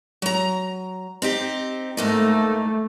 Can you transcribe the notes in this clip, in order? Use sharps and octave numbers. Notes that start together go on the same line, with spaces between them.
F#3 A#5
C4 D#4 G4
G#2 A3 A#3 D#4